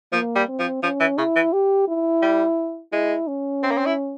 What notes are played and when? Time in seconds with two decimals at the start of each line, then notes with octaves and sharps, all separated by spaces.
0.13 F3 A#3
0.35 G3
0.48 C4
0.59 F3
0.83 F3 C#4
1.00 E3
1.18 C#3 E4
1.35 E3
1.53 G4
1.88 E4
2.22 G3
2.93 G#3 E4
3.28 C#4
3.63 C4
3.71 A#3
3.78 C4
3.86 E4